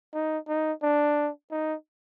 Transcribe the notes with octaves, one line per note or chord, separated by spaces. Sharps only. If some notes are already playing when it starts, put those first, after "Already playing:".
D#4
D#4
D4
D#4